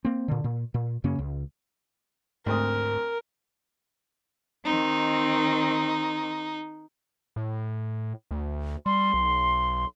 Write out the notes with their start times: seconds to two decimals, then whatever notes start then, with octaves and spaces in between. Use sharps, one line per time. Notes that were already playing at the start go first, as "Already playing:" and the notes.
0.05 A#3 C4
0.28 A#2 D3
0.44 A#2
0.74 A#2
1.04 F#2 C#3 A#3 C#4
1.19 C#2
2.46 D2 G#2 C4 A#4 D#6
4.65 D#3 C4 D#4
7.36 A2
8.31 D2
8.86 G3 C6
9.14 B1